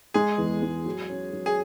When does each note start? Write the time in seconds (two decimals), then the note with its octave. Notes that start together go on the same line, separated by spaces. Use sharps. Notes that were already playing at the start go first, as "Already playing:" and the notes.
0.14 G#3 G#4
0.38 E2
0.63 G#3
0.86 F#3
1.10 C#4
1.33 F#3
1.46 G#4